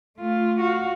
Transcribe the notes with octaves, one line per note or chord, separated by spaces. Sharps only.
A3 F4
F#4 F5